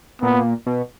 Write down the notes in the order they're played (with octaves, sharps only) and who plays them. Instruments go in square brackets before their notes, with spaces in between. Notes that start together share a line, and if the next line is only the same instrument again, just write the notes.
[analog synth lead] A#2 [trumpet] B3
[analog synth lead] B2